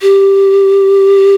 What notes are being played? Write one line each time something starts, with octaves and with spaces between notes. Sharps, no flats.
G4